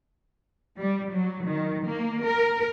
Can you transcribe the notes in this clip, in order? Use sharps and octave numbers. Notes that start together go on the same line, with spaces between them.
G3
F#3
D#3
A#3
A#4